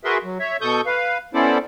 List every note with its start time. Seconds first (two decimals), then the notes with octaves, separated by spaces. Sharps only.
0.04 F#4 G#4 A#4 B4 E5 C6
0.24 F#3
0.39 C#5 E5
0.61 B2 A4 C#6 D#6 G6
0.86 B4 F5
1.34 B3 C#4 E4 A4 C5 D5